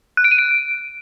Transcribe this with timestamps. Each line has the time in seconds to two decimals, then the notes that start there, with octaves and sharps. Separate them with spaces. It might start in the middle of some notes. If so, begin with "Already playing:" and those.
0.17 F#6
0.24 D7
0.31 D#7
0.38 D7